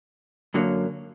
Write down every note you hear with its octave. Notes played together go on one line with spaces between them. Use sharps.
F#2 D3 F#3 A#3